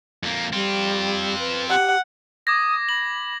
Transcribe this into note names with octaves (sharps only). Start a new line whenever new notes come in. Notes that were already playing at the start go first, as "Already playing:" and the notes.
F2 A#3
G3 C4 F4
B4
G4 F#5
D6 D#6 G#6 A#6
B5 F#7